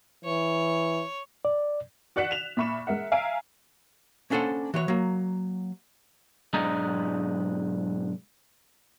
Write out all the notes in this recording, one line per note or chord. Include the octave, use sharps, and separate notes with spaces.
E3 C#5
D5
F#4 D5 F#5 F#6 B6 E7
E7 F7
A#2 E5 B5 C#6 E7
G#3 A#4 E5 F#5
E5 F5 G#5 A#5 E6 D7
A#3 C#4 D4 A4 C5 F#5
E3 F#4 C#5
F#3 A#3
B1 G#2 G#3 D4 D#5 A#5